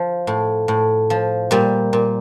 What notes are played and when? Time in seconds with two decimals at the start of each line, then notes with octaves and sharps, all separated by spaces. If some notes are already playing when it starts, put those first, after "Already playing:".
Already playing: F3
0.27 A2
0.68 A2
1.10 F3
1.51 A#2 G3
1.93 A#2